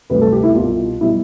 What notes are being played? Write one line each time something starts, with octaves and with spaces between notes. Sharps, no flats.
D2 C3 G3 B4
A4
G4
E4
C2 B2 G3 F4
B2 G3 E4